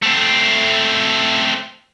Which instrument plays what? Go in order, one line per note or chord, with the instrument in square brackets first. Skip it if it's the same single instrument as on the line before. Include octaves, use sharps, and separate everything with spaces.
[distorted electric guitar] A3 C4